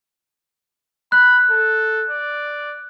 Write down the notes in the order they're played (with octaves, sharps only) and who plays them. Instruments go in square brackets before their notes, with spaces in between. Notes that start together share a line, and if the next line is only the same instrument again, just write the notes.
[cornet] B5 [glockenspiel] F#6
[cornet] A4
D5